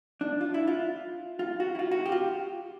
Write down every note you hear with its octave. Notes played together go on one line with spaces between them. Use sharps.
D4
F4
E4
F4
F4
F#4
E4
F4
F#4
G4
F4